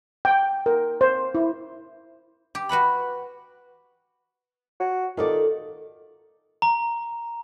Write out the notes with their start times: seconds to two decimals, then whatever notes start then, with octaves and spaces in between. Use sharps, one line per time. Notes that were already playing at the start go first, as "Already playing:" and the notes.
0.25 G5
0.66 A#4
1.01 C5
1.35 E4
2.55 G4
2.69 F#4 B4 F#5 B5
4.80 F#4
5.17 D#3 F4 A4 D5
6.62 A#5